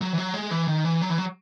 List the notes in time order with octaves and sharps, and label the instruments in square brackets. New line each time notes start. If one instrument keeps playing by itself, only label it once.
[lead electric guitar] F#3
E3
F#3
G#3
E3
D#3
E3
F#3
E3
F#3